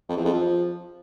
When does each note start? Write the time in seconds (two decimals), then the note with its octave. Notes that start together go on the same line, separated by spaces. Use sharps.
0.09 F2
0.17 E2
0.25 F2
0.33 F3